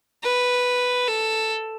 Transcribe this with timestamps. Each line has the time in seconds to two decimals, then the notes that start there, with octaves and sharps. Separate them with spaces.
0.23 B4
1.07 A4